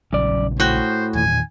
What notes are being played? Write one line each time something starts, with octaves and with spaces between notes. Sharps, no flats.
A#1 F#2 C#3 D5
A2 F#4 C5 G5
E2 A#2 D#3 G#5